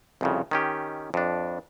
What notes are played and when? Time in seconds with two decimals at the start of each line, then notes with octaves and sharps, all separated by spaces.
0.21 C2 F2 C#3
0.51 D#3 C#4 G4
1.14 F2 D4